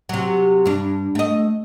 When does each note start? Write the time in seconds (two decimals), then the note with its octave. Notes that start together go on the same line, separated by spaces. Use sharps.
0.09 C3 F#3
0.66 G2 D4
1.15 A3 D#5